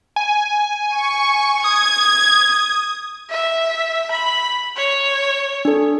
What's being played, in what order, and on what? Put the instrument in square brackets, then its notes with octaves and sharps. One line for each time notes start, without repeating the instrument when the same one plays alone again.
[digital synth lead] G#5
[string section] C#6
[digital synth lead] D#6 [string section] G#6
[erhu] E5
B5
C#5
[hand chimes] D4 A4